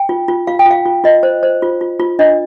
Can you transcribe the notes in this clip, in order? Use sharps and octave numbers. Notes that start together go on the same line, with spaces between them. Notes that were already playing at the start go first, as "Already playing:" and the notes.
Already playing: G5
F4
F4
F4 F5
G5
F4 F5
F4
F4 D#5
C5
C5
F4
F4
F4
D4 D#5